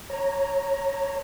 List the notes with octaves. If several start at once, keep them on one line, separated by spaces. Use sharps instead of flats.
C#5 A#5